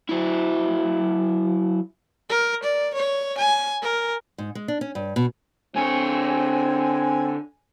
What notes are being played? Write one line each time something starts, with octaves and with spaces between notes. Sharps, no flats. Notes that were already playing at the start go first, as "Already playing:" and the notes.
F#3 E4
A#4
D5
C#5
G#5
A#4
G#2
G#3
D4
C#4
G2
B2
D3 C4 C#5 G#5